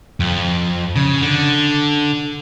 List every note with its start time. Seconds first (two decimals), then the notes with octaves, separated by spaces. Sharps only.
0.20 F2
0.96 C#3
1.22 D3